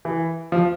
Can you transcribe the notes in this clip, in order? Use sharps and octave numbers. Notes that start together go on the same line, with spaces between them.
E3
F3